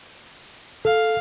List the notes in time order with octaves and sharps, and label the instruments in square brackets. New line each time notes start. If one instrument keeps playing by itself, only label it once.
[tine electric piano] A4 [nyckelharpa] F5